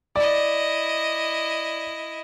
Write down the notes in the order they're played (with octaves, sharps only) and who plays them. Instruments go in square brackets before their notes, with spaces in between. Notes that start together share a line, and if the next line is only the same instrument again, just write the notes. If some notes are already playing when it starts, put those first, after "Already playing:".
[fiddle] E4 D#5 [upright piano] D5